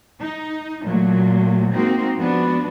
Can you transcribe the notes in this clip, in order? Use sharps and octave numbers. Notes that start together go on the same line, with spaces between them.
D#4
A#2 F#3 A3
G#3 A#3 C4 D#4 F#4
F3 G#3 B3 D4 F#4